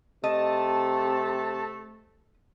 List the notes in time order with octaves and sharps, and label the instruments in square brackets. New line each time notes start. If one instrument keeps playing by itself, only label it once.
[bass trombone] C3 [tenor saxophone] A3 [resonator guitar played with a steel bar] D#5 [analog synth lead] A5